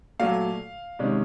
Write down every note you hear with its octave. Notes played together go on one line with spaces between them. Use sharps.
A#2 F#3 A3 F5
C3 D#3 G#3 C#4